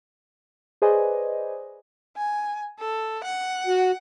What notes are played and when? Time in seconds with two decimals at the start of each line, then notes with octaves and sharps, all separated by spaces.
0.82 G#4 B4 C5 D5 D#5 G#5
2.17 G#5
2.79 A4
3.24 F#5
3.67 F#4